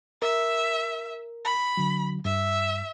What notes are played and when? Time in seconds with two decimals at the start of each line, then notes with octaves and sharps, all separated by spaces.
0.22 A#4 E5
1.45 B5
1.77 D3 F#3
2.25 G2 E5